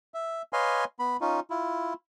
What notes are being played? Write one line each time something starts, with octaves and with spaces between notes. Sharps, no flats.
E5
B4 C#5 D#5 F5 G#5 C6
B3 B5
C#4 D#4 F4
E4 F4